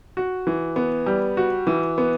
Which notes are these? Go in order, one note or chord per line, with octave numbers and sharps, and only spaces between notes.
F#4
E3
B3
G3
F#4
E3
B3